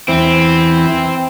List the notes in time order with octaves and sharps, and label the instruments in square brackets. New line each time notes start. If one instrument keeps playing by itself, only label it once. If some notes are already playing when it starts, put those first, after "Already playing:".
[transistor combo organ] E2 E3 [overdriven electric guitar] C4